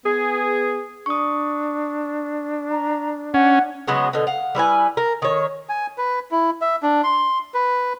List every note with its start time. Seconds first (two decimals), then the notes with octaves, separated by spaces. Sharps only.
0.05 B3 G#4
1.06 D4 C#6 D#6
2.71 A#5
3.34 C#4 F#5
3.88 C#3 F#3 G#3 B3
4.13 B2 D3
4.27 F5 F#5
4.55 G3 E4 B4 G#5
4.97 A#4
5.22 D#3 C#5
5.69 G#5
5.98 B4
6.31 E4
6.61 E5
6.83 D4
7.04 C6
7.54 B4